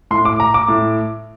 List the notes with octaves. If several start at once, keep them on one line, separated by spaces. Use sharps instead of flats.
A2 C6
D6
A#5
D6
A2